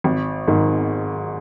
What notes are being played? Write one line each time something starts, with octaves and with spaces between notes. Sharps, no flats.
G#1
G#2 D#3